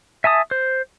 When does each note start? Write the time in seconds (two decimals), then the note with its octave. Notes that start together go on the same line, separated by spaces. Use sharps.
0.24 E5 G#5 A5 D#6
0.51 C5